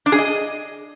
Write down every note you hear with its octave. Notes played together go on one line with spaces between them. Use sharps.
D4
G#4
D#5